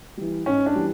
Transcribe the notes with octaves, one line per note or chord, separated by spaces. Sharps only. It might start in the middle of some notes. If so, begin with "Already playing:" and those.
E3 G3
G#2 C#4
D4
E3 G3